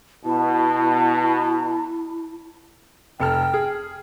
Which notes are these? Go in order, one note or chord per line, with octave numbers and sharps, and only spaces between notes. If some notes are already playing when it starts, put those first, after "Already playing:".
B2 E4 A5
F1 A4 G5 F6
G#4